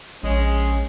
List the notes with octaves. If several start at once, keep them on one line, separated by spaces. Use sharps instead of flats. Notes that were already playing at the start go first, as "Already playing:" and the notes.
A#1 G#3 C#4